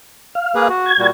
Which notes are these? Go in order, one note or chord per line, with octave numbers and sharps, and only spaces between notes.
F5
A#3 G#4 B4
F#4
G#6
A#2 G3 F#4